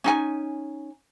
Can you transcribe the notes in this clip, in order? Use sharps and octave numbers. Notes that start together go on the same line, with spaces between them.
C#4 D#4 G#5